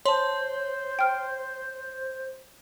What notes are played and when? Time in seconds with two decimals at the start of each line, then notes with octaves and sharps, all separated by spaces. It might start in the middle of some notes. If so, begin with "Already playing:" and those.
0.06 C5 C#5 A5 C6
0.99 G5 F6